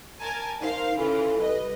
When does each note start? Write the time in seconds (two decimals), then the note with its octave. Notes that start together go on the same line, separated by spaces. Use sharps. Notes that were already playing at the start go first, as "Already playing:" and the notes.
0.20 A#4 G#5 A5
0.61 D#4 A#4 C5 F5
0.97 C#3 E3 F4 A4
1.38 C2 B4 D#5